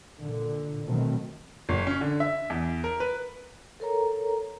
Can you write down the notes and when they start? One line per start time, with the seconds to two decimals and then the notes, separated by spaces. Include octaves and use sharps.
0.20 A#2 D3
0.85 B2 D#3 F#3 A3 C4
1.69 F#1
1.87 C#4
2.01 D3
2.20 E5
2.50 E2
2.84 A#4
3.00 B4
3.80 A4 A#4 C#5 A#5